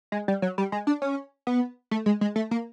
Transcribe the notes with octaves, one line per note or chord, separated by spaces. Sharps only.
G#3
G3
F#3
G3
G#3
D4
C#4
B3
A3
G#3
G#3
A3
A#3